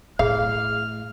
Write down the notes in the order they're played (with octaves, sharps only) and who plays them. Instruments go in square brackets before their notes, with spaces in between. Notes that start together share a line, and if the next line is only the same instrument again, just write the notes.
[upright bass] A2 [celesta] G#4 [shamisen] F5 [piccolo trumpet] F6